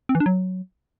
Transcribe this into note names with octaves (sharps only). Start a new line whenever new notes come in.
C4
E3
D4
F#3